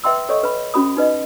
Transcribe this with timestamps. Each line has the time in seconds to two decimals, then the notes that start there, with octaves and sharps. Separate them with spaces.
0.04 B4 E5 G5 C6 E6
0.29 A4 C#5 D#5 C#6
0.43 B4 B5
0.74 C#4 F#4 B5 D#6
0.97 D#4 B4 D#5